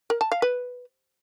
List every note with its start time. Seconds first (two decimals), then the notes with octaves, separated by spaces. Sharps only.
0.10 A#4
0.21 A5
0.32 F5
0.42 B4